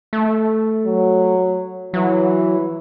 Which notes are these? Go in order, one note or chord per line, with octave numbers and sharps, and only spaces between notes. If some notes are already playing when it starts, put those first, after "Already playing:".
A3
F#3
E3 F#3